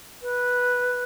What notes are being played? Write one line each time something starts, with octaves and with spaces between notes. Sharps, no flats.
B4